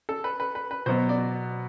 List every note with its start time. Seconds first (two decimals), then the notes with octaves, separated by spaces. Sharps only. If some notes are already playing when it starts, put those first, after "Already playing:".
0.09 A4
0.24 B4
0.40 B4
0.55 B4
0.71 B4
0.86 B2 F#3 B3 C5
1.09 D5